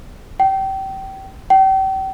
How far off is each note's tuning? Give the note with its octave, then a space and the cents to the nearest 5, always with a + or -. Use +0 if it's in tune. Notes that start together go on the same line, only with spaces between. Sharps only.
G5 -25
G5 -35